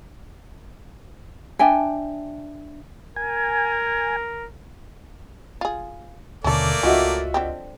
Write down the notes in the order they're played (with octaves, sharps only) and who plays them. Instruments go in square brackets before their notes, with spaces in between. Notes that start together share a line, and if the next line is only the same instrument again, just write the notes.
[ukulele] D4 E5 G5 G#5
[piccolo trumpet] A#4 [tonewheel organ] G#5
[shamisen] F4 G#4
[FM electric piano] D#2 B2 D3 [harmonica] A3 A#3 D5 [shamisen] C#4 A4
[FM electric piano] C#2 D#5 [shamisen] C#4 [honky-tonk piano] F4 F#4 E5
[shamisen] D3 C4 G4